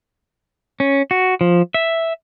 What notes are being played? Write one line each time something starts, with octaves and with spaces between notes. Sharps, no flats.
C#4
F#4
F3
E5